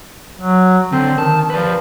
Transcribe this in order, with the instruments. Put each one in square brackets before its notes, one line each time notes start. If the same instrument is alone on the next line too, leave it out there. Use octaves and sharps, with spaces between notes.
[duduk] F#3
[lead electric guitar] D3 [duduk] C4
[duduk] D#3 [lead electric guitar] A5
[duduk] F3 [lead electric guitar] B4 D5